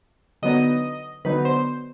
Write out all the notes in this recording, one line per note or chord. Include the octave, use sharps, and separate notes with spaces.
D3 F#3 B3 D#4 D#5
D3 F#3 B3 D#4 B4
C5